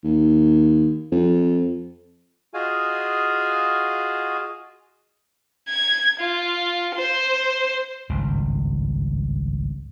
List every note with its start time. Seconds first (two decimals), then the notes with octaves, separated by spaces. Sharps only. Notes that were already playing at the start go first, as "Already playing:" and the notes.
0.04 D#2
1.12 F2
2.54 F4 F#4 G#4 D#5 F5 G#5
5.69 G#6
6.20 F4
6.96 C5
8.09 G#1 C#2 G2